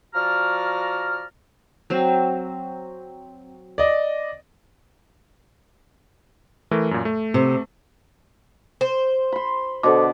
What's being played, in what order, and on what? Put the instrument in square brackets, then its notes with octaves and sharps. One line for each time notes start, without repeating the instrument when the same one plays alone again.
[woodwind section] F3 F#4 D5 A#5 F6
[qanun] F#3 C4
[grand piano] D5 D#5
[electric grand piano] E3 A3 A#4
F#2 A#2
A3
[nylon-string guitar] C3
[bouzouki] C5
[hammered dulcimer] B5 C6
[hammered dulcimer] B2 D3 D5 [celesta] A4 C5 D6